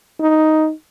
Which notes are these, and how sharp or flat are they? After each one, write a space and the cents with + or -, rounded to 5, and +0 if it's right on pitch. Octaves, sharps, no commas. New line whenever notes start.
D#4 +5